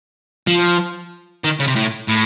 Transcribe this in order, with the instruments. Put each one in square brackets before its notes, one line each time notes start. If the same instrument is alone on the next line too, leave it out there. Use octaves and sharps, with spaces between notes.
[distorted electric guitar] F3
D#3
C#3
C3
A2
A2